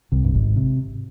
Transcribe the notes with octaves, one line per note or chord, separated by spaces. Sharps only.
C2 C3
G2
G#1 G#2
C3